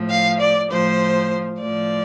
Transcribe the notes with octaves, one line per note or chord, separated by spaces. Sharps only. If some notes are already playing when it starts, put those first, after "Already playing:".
Already playing: A2 F3
F5
D5
A2 F3 C5
A2 F3 D5